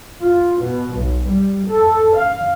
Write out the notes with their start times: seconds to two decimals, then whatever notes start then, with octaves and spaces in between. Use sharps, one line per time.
0.22 F4
0.62 B2
0.97 B1
1.27 G3
1.66 A4
2.17 F5